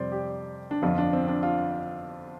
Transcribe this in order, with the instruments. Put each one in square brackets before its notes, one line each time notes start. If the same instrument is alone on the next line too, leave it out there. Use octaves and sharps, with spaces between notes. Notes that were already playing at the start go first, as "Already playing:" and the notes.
Already playing: [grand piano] F2 C3 G3 C5 D5
G4
D4
G1 F2 F3 F4
D4
C4
D4
F4